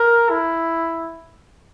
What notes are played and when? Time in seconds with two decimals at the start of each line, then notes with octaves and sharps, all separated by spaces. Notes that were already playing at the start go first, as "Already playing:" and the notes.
Already playing: A#4
0.30 E4